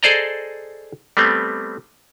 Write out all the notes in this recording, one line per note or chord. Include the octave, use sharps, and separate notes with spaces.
G#4 A4 C5 D5 D#5 A#5
G3 A3 B3 C4